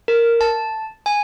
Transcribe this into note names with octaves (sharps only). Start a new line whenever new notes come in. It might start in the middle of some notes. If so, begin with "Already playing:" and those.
A#4
A5
G#5